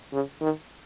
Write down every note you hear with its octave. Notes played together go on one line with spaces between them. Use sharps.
C#3
D#3